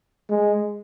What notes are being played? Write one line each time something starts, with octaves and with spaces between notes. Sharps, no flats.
G#3